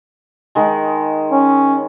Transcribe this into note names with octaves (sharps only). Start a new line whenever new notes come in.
D#3 G#3
C#4